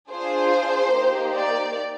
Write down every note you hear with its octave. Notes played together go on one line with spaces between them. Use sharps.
D4 F4 G#4 C5
A#3 D#4 G4
D5